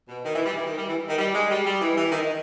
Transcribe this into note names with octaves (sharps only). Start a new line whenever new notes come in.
B2
D#3
E3
G3
E3
D#3
G3
E3
D#3
G3
G#3
G3
G3
E3
E3
D#3
D#3